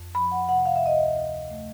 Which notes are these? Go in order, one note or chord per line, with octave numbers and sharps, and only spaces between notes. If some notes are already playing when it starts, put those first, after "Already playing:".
Already playing: F2
F3 B5
F#5
C3 F#5
F5
E5
D2 D#5
E5
D2
A3